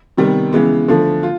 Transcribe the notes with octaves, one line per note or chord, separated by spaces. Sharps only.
C3 D#3 G3 B3
C#3 E3 G#3 B3
D3 F3 A3
F4